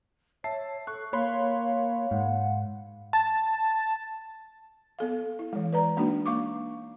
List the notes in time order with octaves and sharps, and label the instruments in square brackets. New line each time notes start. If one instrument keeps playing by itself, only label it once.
[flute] C#5 [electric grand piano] E5 A5 C7
[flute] A4 [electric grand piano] C#6 F#6
[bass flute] A#3 [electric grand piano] C#5 B5 C6 [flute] F5
[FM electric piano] G#2 [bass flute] F#5
[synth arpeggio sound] A5
[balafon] B3 A4 F5
E4
E3 G#3
B4 D5 A#5
G#3 A#3 D4 D#4 F#4
A#3 F5 C#6 D6